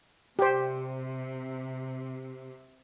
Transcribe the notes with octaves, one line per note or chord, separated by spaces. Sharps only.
C3 G4 C5